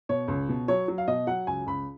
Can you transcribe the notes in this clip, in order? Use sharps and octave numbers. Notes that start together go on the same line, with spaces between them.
B2 C#5
C#2
B2
F#3 C#5
F#3
F5
B2 D#5
F#3 F#5
C#2 G#5
C#2 B5